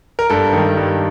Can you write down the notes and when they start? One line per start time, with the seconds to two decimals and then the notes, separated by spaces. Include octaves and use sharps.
0.19 A#4
0.30 G2 A4
0.53 D#3 G3
0.77 G2